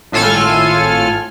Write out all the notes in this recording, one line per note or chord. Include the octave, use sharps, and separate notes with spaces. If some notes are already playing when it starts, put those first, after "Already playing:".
G#1 A2 F4 A4 G#5 F6